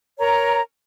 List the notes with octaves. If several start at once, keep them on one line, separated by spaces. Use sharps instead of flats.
A#4 C#5 A#5